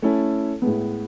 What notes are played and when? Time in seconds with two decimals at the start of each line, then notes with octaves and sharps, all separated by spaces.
0.02 A3 C#4 E4 A4
0.62 A2 G#3 B3